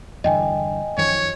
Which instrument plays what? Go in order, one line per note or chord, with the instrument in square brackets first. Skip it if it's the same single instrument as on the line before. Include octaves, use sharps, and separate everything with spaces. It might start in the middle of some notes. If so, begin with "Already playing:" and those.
[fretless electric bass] E2 G2 D3 [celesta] D#5 G5 G#5
[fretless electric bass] F#2 D#3 F3 [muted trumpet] C#5